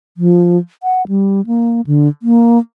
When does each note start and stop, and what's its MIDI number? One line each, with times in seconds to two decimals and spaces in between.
0.17 0.58 53
0.83 1.06 78
1.08 1.45 55
1.47 1.81 58
1.87 2.08 50
2.23 2.59 58